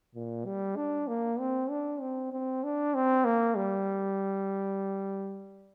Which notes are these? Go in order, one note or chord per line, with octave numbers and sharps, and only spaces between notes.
A#2
G3
D4
A#3
C4
D4
C4
C4
D4
C4
A#3
G3